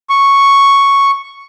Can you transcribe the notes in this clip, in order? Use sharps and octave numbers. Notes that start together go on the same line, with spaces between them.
C#6